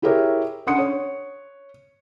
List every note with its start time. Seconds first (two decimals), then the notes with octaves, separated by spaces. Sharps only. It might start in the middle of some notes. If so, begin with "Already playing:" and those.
0.02 E4 G4 G#4 A#4 C#5 E5
0.67 C#4 D4 F#5 C6 D#6 C#7
0.79 C#5